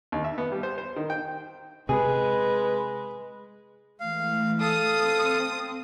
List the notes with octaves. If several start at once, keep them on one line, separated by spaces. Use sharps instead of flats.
D#2
E5
B3
G3
C5
C5
D#3
G5
C3 G#3 G#4 B4
E3 G#3 A3 F5
A4 F5 D#6
C4